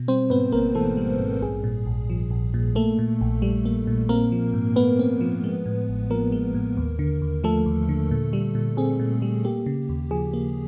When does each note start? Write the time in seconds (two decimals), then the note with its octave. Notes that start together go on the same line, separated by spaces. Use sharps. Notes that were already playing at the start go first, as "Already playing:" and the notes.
Already playing: B2
0.08 G3 C4 C5
0.30 G#2 B3 B4
0.52 G#1 A#3 A#4
0.75 E3 A3 A4
0.97 G3
1.19 G#2
1.42 A#1 G#4
1.64 A#2
1.86 A#1
2.10 F3
2.31 A#1
2.54 A#2
2.75 A3 A#3 A4
2.99 A#2
3.21 A#1
3.42 G3
3.65 A#3
3.87 A#2
4.09 A#3 C4 A#4
4.32 F3
4.54 G#2
4.76 A3 B3 B4
4.99 C4
5.21 F3
5.44 G#3
5.66 A2
5.89 A1
6.10 F3 A#3 A#4
6.32 G#3
6.54 A2
6.77 D#2
6.99 D3
7.22 D#2
7.44 F3 A3 A4
7.66 D#2
7.89 D3
8.11 A#2
8.33 G3
8.55 A#2
8.77 C4 G#4
8.99 A#2
9.22 G3
9.45 A#3 G4
9.66 C#3
9.89 D#2
10.11 F3 G#4
10.33 A#3